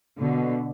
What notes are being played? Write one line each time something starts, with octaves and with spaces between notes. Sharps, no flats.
B2 D3